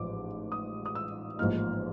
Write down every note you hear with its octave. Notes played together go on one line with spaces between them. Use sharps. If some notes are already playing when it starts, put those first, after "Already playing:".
Already playing: A1 G#2 F3 D6
D#6
D#6
E6
A1 G#2 F3 A#3 D#4 F6